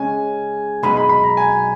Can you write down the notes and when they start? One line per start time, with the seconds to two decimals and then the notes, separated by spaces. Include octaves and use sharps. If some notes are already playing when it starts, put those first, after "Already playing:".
Already playing: C#3 G#3 C#4 G#5
0.83 B1 B2 G#3 D#4 B5
0.97 B5
1.09 B5
1.24 A#5
1.37 G#5